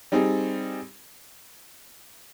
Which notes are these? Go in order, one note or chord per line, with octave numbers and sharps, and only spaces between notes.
G3 C4 D#4 G#4